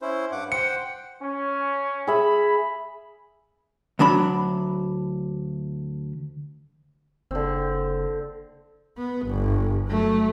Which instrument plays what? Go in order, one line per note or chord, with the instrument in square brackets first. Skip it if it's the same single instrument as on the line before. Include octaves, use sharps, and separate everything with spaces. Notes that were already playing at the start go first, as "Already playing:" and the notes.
[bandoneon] C#4 E4 C5
G2 F#5 D6
[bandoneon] C5 F#5 G5 [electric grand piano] C#7
[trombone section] C#4
[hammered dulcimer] G#4 E5 [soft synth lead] B5
[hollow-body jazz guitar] D2 F#3 D4 B5
[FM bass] F#1 [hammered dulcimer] D3 C4
[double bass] B3
G1
F#3 A3